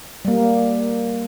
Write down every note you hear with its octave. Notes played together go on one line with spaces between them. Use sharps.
G3 A#3